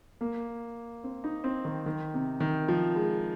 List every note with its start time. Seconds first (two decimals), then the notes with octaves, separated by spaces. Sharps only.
0.21 A#3
1.04 C4
1.24 D#4
1.44 C4
1.65 D#3
1.86 D#3
2.14 C3
2.40 D#3
2.68 F3
2.96 G#3